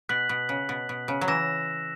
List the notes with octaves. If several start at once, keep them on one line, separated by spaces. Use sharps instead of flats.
B2 F#6 B6 F#7
B2
C#3
B2
B2
C#3
F#3
E3 E6 A#6 E7